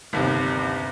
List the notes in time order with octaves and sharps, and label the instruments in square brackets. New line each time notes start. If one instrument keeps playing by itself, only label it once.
[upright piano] G1 D#2 C3